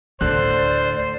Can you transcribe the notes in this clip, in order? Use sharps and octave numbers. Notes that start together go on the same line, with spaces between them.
D2 A2 D3 C5 D5 F#6